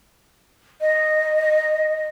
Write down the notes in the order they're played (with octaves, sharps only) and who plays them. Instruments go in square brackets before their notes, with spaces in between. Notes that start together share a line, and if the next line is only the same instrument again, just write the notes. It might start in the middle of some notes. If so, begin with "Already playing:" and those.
[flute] D#5